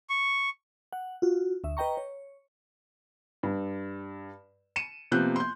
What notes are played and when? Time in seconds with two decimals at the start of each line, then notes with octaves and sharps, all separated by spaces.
0.10 C#6
0.93 F#5
1.22 F4 F#4
1.64 D2 E5
1.77 B4 D#5 G5 A#5 C#6
1.97 C#5
3.43 G2
4.76 C#7 D#7 E7
5.12 C3 F3 A#3 B3 F#6 G6
5.36 C6 G6